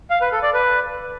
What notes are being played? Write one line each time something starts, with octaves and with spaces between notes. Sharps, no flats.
F5
B4
A4
D5
B4